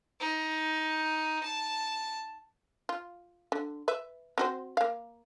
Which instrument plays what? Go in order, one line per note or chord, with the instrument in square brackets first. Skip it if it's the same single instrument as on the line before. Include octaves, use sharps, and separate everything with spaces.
[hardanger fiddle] D#4
A5
[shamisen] F4
D3
B4 E5
C4 F#4 C5
A#3 F5